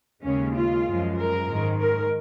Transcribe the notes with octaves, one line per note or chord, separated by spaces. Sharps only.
D#2 C#3 G#3 C#4
F4
F#2 F3 G#3
A#4
G#2 D#3 G#3
A#4